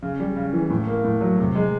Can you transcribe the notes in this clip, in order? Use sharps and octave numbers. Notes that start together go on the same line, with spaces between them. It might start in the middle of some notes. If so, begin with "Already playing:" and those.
C#3
G3
C#3
E3
A2
A#3
A2
F#3
C3
G#3